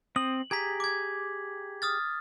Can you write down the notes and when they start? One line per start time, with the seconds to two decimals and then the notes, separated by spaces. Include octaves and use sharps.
0.16 C4 D#6 F#7
0.51 G4 G#4 A#5 G#6 B6
0.80 D6 G#6
1.82 D#6 F6 A6